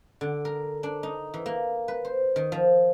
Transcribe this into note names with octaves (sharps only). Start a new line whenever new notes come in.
D3
A#4
D4
D#4
E3
A#3
B4
C5
D#3
F3